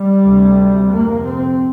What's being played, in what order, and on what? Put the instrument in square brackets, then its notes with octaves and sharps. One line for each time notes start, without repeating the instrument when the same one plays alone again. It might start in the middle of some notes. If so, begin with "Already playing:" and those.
Already playing: [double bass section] G3
D2 C3
F2 C3 A#3
C4